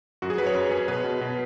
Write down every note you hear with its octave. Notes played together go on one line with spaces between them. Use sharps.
F#2 F#4
G#4
F#3 B4
C#5
F#2 B4
F#2 G#4
B2 B4
B2
B2